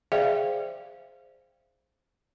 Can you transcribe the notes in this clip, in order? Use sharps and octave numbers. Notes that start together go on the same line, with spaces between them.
G#4 C5 D5 E5 F5 G5